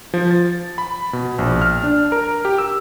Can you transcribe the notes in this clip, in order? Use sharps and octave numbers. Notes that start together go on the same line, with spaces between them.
F3
A6
B5
B2
A#1
F6
D4
A#4
G4
E6